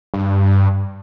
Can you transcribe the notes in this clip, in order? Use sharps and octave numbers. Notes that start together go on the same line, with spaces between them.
G2